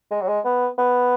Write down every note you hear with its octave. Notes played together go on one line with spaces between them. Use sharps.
G#3
F#3
G#3
B3
B3